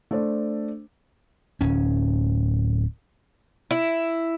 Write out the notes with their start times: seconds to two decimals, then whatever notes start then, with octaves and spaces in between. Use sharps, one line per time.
0.11 A3 D4 C5 D5
1.61 D1 C#4
3.71 E4